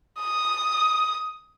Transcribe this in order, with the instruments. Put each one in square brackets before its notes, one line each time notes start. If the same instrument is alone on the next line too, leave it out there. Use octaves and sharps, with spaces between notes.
[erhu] D#6